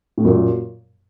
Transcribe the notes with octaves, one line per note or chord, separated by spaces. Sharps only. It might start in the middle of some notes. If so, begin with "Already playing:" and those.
A2
F#2 A#2